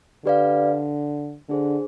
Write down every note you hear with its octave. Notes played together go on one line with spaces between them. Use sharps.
D3 G4 B4 D5 F5
D3 D4 G#4 C5